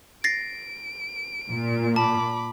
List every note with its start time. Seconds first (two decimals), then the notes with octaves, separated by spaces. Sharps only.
0.24 A6 A#6 C7 D7
1.51 A#2
1.96 A5 B5 D6